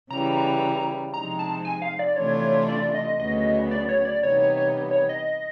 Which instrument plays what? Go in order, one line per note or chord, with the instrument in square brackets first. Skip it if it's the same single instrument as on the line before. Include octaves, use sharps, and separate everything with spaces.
[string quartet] C#3 E3 G3 [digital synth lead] A#5
[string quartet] C3 F3 G#3 C4 D#4 [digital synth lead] A#5
[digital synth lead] A5
G#5
F5
D5
[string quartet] C3 E3 A3 D4 F4 [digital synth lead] C#5
[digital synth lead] D5
D#5
[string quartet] D2 C#3 F#3 B3 [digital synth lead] D#5
[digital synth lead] D5
C#5
D5
[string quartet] C3 E3 G3 B3 D#4 [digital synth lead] C#5
[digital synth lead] C#5
C#5
C#5
D#5